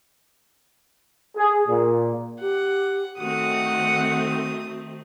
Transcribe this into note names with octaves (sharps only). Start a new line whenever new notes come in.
G#4
A#2
G4 F#5
D#3 A3 C4 F#4 F#5 D#6